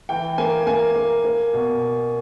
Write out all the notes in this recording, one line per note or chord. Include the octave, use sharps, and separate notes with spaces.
E3 G5
A#3 G#5
A#3 G#5
A#3
A#3
B2